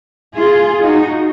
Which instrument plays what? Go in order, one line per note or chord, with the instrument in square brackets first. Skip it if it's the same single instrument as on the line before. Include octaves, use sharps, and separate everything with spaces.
[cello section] F4 G#4
D#4 F#4